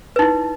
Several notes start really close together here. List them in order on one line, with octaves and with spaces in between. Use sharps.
B4 D#4 E4